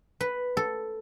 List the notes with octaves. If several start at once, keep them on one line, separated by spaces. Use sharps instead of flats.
B4
A4